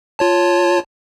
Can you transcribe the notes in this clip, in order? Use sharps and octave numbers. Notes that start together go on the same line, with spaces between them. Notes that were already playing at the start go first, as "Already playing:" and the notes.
F4 C#5 A5